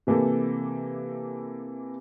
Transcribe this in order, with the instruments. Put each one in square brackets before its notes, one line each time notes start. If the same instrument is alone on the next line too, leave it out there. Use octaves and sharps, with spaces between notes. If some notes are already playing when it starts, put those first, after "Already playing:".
[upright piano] C3 E3 A#3 G4 A4